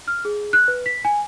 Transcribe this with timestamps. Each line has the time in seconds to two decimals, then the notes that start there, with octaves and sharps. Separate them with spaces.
0.08 F6
0.25 G#4
0.53 F#6
0.68 B4
0.86 B6
1.05 G#5